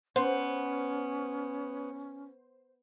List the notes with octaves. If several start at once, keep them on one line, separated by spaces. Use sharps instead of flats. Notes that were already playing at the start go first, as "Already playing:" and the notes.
B3 C#4 C5